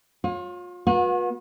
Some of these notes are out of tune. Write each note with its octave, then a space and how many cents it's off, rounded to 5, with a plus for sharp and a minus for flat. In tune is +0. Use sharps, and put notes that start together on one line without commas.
F4 +35 C#5 -20
B3 -30 F#4 -45